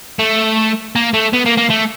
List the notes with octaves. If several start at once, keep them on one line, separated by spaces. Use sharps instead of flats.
A3
A#3
A3
B3
A#3
A#3
A3